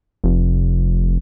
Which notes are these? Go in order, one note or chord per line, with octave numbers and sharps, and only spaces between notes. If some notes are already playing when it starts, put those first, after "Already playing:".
F1